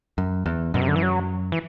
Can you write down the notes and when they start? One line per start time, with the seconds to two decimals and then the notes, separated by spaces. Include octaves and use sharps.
0.18 F#2
0.46 E2
0.74 F#2 B2
0.82 C3
0.88 D3
0.96 E3
1.03 F#3
1.52 E3